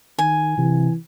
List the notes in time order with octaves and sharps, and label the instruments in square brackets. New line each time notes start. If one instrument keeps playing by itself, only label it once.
[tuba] D#3 [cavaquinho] G#5
[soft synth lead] C3 [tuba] E3